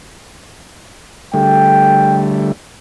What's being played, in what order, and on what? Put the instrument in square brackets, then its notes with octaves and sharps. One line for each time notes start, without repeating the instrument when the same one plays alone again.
[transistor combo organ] D3 G3 A3 [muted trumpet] G5